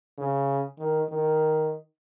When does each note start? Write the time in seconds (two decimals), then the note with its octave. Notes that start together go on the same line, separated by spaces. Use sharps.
0.18 C#3
0.79 D#3
1.09 D#3